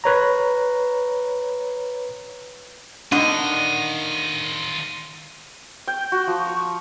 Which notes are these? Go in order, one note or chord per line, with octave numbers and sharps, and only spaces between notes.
B4 C#5 A#5
D3 D#3 G3 B3 D4 D#4 F4 D#7
G5
F#4
F3
C#6